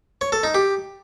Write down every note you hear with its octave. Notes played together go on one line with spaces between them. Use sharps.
C#5
A4
D#4
G4